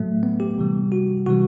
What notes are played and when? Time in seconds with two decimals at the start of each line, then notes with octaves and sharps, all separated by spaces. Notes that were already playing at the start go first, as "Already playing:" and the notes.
Already playing: A2 F#3 A3
0.23 B3
0.40 G4
0.58 C3 E3 G3
0.92 F#4
1.26 C3 E3 G3 F#4